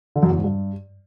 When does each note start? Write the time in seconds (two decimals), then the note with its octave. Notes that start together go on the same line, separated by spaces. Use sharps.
0.16 D3
0.23 F#2
0.30 E2
0.37 G#2
0.44 G2